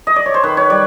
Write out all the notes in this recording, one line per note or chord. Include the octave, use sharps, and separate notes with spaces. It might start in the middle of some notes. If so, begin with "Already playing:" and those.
D#5
D5
C#5
C5
D#3 B4
C#5
G3 D5